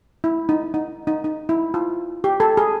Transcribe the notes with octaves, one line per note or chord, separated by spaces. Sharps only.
E4
D#4
D#4
D#4
D#4
E4
F4
G4
A4
G#4